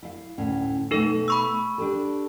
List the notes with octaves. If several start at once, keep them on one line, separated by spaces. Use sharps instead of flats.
E4 F5
D2 A2 C#4
B2 A3 D#4 A4
B5 C#6 E6
D4 G4 A4